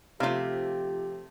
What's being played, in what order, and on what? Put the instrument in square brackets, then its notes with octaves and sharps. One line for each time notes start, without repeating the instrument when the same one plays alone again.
[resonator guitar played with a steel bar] C3 A3 [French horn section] F3 G4 [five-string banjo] F4 F5